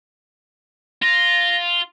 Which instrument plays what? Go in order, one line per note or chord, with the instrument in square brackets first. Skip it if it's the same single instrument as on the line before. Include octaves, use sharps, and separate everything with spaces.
[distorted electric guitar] F4 [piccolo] A#6